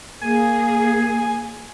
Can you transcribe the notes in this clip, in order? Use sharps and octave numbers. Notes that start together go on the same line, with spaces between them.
A#3 G#4 G#5